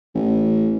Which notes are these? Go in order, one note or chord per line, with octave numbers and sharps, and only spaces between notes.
A1